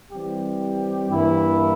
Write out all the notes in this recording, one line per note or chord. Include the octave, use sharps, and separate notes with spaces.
E3 G3 C4 G4
G2 E3 A#3 E4